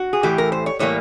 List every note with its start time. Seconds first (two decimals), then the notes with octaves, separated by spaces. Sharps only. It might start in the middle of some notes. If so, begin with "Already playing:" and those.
Already playing: F#4
0.13 G#4
0.23 A2 E3 A3 G4
0.38 A#4
0.52 C5
0.66 C#5
0.79 A2 E3 G3 A#3 C#5